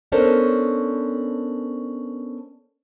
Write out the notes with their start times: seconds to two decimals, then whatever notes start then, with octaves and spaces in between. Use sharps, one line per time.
0.12 B3 C#4 D4 A4 A#4 C5